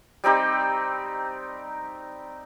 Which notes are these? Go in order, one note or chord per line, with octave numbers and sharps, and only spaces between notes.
G3 C4 D#4 G4